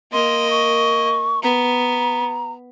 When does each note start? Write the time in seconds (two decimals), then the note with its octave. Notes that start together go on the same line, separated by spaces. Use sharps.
0.12 A#3 D#5 C6
0.50 C#6
1.43 B3 A#5